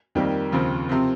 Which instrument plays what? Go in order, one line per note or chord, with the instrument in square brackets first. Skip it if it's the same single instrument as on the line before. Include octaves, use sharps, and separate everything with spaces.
[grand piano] F2 D#3 G3 A#3
D#2 C#3 F3 C4
C3 F3 C4